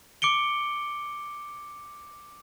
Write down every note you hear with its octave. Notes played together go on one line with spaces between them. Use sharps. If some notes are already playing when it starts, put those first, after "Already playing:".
D6 C#7 D7 G7